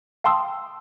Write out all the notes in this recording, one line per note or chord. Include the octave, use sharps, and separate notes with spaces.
F5 G5 A5 C6 D#6 E6